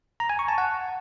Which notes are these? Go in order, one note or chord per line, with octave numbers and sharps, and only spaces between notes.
A#5
G#5
C#6
A5
F#5